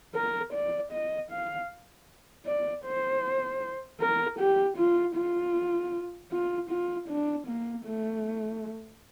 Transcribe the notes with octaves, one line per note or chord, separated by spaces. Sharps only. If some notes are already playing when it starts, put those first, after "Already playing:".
A#4
D5
D#5
F5
D5
C5
A#4
G4
F4
F4
F4
F4
D4
A#3
A3